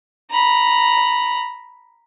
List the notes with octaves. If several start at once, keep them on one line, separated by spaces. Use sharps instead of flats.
A#5 B5